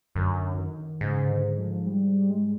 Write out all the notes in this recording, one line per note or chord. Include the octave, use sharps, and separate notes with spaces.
F#2 D3
D#3
G#2 C#3
D3
F3
G3
G#3